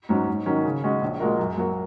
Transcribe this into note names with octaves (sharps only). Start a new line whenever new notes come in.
G#2 F#3 C#4
G#2
D#3 F#3 C#4
C#3
G#3 C#4 F#4
A#1
A#2 G#3 F#4 A#4
F#2
F#3 A#3 F#4